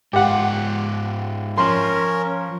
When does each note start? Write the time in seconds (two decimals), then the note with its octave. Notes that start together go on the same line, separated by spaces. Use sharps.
0.13 G#2 F4 G4 F#5
1.58 F3 C#4 A#4 C6